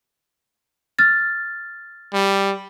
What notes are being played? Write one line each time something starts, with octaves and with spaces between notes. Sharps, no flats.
F6 A6
G3